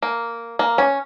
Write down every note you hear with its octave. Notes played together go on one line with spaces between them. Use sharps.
A#3
A#3
C#4